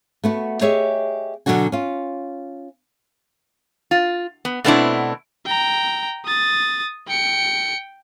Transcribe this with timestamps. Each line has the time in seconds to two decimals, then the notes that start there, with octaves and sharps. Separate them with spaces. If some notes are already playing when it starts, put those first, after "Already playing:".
0.24 A3 B3 F#4
0.61 G4 G#4 C#5 D#5 E5
1.46 B2 D3 F#3 D4 F#4 G#5
1.72 C#4 F4
3.91 F4
4.45 B3
4.64 B2 A3 B3 C4 D4 E4
5.46 G5 A#5
6.25 D#6 A6
7.07 G5 C#7